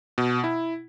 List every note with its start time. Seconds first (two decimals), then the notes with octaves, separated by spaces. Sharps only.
0.18 B2
0.44 E4